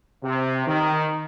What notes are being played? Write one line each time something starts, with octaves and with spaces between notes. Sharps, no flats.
C3
D#3